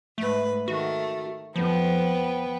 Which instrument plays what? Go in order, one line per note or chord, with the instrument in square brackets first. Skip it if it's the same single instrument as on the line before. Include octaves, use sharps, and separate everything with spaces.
[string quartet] G#2 B4 [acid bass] A3
[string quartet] D#3 A3 [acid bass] F#4
[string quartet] F2 [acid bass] F3 [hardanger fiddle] B3 G5